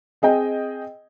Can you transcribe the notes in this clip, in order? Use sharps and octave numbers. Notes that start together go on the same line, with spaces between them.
C4 G#4 D#5 G5